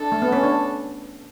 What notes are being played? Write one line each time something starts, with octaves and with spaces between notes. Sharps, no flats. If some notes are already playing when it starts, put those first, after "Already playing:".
Already playing: D4 A4
A3
B3
C#4
D4